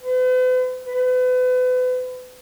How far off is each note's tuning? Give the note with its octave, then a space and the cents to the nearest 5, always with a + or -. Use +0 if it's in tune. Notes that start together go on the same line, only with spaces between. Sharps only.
B4 +45
B4 +35